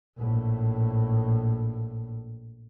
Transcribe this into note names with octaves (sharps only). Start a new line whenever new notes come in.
A#1 A2